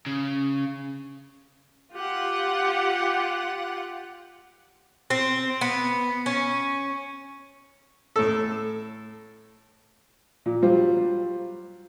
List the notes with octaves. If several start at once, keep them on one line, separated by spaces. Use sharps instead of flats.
C#3
F4 G4 F#5
C4
B3
C#4
A2 A4
A#2
F#3 G3 F4 C5